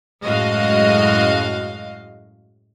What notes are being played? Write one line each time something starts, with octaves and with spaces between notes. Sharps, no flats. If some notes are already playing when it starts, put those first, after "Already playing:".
F#2 A2 G#3 F#4 D#5 F5